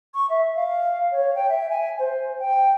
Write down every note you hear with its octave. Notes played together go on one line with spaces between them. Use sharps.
C#6
E5
F5
C#5
G5
E5
G#5
C5
G5